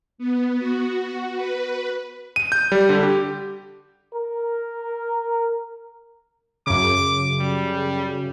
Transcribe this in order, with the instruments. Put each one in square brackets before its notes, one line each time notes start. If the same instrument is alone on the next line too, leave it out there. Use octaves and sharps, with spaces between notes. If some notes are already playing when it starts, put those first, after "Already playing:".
[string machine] B3
F#4
B4
[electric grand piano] D#7
G6
G3
D3
G4
[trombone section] A#4
[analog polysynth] F#2 C#3 [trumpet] D6
[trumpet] G3